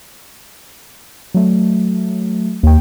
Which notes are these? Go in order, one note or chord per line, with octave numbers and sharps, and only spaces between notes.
F#3 A3
D#2 A#3 G5